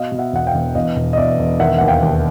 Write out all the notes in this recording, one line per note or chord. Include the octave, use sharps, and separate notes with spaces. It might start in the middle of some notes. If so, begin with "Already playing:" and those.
Already playing: B2 D#5 F5
B2
E5 F#5
E1 F#5
F5 G5
E1
E2 D#5 F5
E1
D#5
E2 D5 E5
E1
D#3 E5 F#5
D#2 F#5
F5 G5
D#2